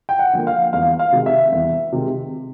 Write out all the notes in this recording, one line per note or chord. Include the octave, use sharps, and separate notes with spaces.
G5
F#5
D3 F3 A#3
F5
E2 F5
F5
C3 D#3 G#3
E5
E2
C3 D#3 G#3